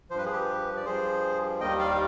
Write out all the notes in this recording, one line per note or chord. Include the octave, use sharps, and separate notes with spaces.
G2 F3 B4 C5
G#4
G4 B4
D5
G2 F3 G#4 C5
D#2 D#3 G3 D#5 G5
D5 F5
F5